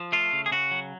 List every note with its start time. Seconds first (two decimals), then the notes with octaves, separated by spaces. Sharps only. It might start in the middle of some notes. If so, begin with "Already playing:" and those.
Already playing: F3
0.12 A3 F4
0.33 C#3
0.46 G#4
0.51 C#3 F#4
0.71 F#3